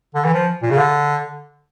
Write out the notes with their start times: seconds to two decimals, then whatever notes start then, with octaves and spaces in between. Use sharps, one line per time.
0.15 D3
0.25 E3
0.33 F3
0.62 A#2
0.71 C#3
0.78 D3